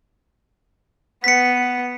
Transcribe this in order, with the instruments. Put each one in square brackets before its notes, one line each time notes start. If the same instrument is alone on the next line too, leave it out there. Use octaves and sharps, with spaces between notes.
[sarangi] B3 [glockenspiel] B6 C#7